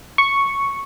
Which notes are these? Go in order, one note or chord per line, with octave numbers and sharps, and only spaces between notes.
C#6